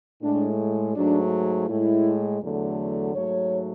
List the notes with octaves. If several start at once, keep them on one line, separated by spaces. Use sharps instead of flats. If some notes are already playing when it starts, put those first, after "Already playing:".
A2 G#3 D4
G#2 F#3 A3 D4
A2 G#3 E4
E2 D3 F#3 A3
G#2 F#3 A3 C#5